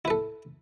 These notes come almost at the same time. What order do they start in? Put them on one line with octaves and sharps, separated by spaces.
E4 B4 A4